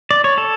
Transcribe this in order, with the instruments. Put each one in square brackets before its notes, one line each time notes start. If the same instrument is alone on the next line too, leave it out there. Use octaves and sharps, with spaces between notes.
[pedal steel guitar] D5
C#5
A4